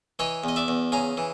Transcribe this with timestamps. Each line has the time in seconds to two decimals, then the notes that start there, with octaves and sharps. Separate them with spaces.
0.19 E3 C#5 D#5
0.44 E2 D#5
0.56 D5 E5
0.68 E2
0.92 C#3 G#5 A#5
1.17 E3